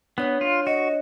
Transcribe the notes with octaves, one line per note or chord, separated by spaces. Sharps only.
B3 D4 C#5 F#6
F4
F#4 D#5